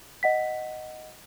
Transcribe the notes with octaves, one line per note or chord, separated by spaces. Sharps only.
D#5 F#5 B6